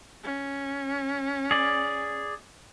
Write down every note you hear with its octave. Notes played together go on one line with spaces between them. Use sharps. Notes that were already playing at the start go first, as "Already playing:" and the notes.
C#4
G#4 D5